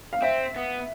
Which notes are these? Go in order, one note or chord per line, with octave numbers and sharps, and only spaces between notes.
F5
C4 E5
B3